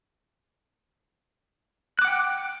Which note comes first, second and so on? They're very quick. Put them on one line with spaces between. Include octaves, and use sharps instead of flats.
F#6 D6 F#5 G5